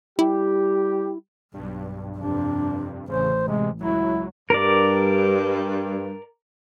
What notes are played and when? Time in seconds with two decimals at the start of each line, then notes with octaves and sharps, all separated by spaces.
0.19 G3 E4 G4
1.54 B1 G2
2.18 F2 C3 D4
3.09 A1 C#3 C5
3.47 C3 G#3
3.81 C#2 F#3 E4
4.50 G2 A#4 D5